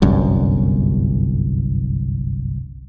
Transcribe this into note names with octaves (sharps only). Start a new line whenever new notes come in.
G1 C2 F#2